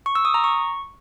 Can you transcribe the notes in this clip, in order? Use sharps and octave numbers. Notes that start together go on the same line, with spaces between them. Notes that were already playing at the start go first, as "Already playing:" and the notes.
C#6
E6
D#6
A#5
C#6